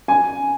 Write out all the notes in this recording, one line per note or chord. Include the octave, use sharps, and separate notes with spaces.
G#5